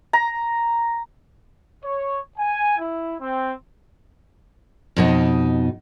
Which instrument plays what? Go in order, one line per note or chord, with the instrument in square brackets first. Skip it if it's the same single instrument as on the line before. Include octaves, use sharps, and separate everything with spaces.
[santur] A#5
[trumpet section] C#5
G#5
E4
C4
[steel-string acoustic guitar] F2 B2 D#4